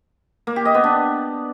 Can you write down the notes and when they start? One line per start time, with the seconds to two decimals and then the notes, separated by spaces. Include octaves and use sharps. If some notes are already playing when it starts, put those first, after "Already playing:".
0.47 A#3
0.56 G4
0.65 D#5
0.75 B3
0.84 D4